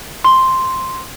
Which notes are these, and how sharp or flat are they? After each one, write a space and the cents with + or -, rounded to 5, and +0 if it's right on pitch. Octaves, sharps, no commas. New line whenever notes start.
C6 +0